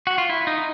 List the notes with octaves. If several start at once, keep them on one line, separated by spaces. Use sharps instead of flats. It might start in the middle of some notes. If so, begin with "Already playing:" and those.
F#4
F4
E4
D#4